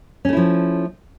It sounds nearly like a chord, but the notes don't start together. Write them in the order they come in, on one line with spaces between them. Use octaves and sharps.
C#4 A3 E4 F3